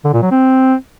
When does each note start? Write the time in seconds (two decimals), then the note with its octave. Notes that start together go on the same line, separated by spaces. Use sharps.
0.05 D3
0.13 A#2
0.22 F#3
0.31 C4